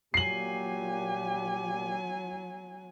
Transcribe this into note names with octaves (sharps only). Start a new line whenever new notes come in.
A#2 F#3 G4 G#5 C7 F#7